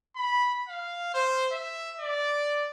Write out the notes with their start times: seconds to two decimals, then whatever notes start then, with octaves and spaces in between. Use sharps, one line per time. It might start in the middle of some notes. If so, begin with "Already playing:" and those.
0.16 B5
0.68 F5
1.14 C5
1.52 E5
2.00 D5